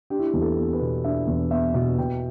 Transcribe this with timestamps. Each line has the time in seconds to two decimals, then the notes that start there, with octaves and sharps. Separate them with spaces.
0.10 D4 G4
0.19 E4
0.27 G4
0.34 E2
0.41 A4
0.57 B3
0.73 B4
0.81 B2
1.04 D4 E5
1.27 E2
1.51 B3 E5
1.74 B2
1.98 B2 G5